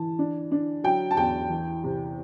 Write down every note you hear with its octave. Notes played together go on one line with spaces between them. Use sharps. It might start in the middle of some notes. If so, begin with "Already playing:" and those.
Already playing: E3 A5
D4
D4
F#3 G5
A5
E2 G5
E3
C3